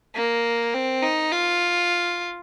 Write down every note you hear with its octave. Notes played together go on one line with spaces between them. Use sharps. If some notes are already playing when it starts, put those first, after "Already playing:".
A#3
C4
D#4
F4